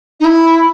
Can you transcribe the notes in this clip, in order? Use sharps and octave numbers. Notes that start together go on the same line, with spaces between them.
D#4
E4